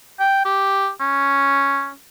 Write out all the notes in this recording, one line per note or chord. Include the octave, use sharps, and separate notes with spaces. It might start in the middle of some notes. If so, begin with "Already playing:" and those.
G5
G4
C#4